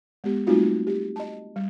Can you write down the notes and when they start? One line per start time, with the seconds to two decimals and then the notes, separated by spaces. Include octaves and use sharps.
0.24 G#3 B3 G4
0.47 G3 A3 C4 D#4 F4 F#4
0.87 G4
1.16 D#5 A5
1.56 G3